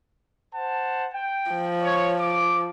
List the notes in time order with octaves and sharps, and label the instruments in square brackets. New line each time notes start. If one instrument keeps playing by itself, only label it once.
[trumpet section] C5 F#5 A5
G5
[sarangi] F3
[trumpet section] C#5
D6